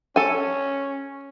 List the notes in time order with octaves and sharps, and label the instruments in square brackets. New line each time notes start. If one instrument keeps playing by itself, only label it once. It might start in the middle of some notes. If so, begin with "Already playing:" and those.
[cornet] C#4 [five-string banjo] A4 G#5